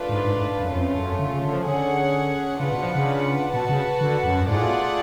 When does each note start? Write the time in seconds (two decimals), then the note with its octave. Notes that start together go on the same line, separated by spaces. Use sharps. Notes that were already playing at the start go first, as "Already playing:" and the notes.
Already playing: A3 D4 F4 B4
0.09 G#2
0.24 G#2
0.37 G#2
0.60 F#2
0.72 F2 A3 C#4 F4
0.95 F#2
1.19 D3
1.31 C#3
1.42 D3
1.54 F3
1.66 D3 C#4 G#4 C#5 F#5
2.60 C#3 D4 F4 B4 F#5
2.72 B2
2.83 F3
2.95 C#3
3.54 B2 F#4 B4 F#5 A5
3.69 C#3
4.01 D3
4.24 F#2
4.48 G#2 A3 F4 G#4 D5 F#5
4.57 A2
4.63 B2